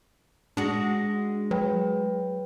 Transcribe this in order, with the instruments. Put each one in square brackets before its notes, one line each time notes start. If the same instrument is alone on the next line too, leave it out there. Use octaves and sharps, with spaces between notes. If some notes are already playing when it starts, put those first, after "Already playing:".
[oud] G#3 F#4 [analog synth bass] D4
[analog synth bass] F#3 [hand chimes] B4 G5